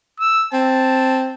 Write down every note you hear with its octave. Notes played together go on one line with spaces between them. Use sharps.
E6
C4 A5